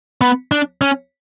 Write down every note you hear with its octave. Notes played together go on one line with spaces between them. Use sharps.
B3
D4
C#4